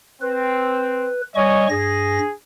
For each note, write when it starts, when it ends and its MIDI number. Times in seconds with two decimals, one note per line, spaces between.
0.22 1.07 60
0.22 1.21 71
1.35 1.67 55
1.35 1.66 73
1.35 1.66 75
1.35 1.66 80
1.35 1.67 85
1.70 2.19 43
1.70 2.32 68
1.70 2.19 94